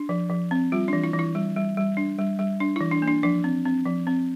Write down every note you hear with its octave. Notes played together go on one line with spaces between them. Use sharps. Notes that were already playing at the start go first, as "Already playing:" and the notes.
Already playing: D4
F3
F3
C4
G3 F4
E3 D4
E4
E3
E4
G3
G3
G3
D4
G3
G3
D4
E3 E4
D4
A#3
D4
F3 D4
C4
C4
F3
C4